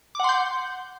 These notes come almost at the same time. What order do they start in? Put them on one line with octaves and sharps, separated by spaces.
D6 F#5 C6 G6